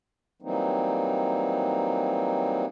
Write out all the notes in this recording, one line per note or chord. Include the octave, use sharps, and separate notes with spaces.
E3 F#3 G3 A#3 C4 D#4